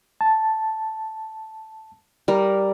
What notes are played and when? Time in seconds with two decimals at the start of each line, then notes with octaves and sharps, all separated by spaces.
0.21 A5
2.28 G3 A#4